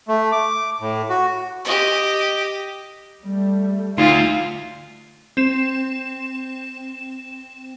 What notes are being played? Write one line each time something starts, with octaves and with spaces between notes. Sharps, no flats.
A3
D6
A2
F#4
G4 D#5
G3 A3
D2 D#4 F4
C4 E7